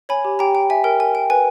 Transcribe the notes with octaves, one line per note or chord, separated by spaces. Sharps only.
C#5 G#5 B5
G4
G4 G5 A#5
G5
E5 G#5
A#4 G5
A#4 G#5
G5
B4 G#5